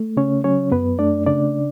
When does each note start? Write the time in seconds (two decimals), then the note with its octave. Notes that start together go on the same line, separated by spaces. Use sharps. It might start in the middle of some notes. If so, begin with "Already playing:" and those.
Already playing: A3
0.17 C#3 C#4 C#5
0.44 F#3 C#4 C#5
0.72 F#2 B3 B4
0.99 A3 D4 D5
1.26 C#3 D4 D5